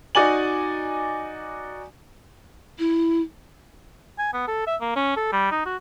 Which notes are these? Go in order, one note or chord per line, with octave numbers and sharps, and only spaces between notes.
D#4 F#4 D5 G#5 F#7
E4
G#5
B3
A4
E5
A#3
C#4
A4
G3
D#4
F#4